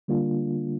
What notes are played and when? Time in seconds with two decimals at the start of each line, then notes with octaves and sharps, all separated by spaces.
0.08 D3 G3 A#3 D4 F4